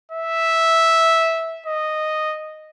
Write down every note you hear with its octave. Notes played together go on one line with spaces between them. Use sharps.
E5
D#5